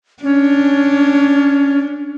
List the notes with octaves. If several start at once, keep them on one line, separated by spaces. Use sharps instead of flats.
C#4 D4